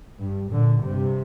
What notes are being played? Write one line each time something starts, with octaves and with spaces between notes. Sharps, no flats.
G2
A#2 D3
G2 C3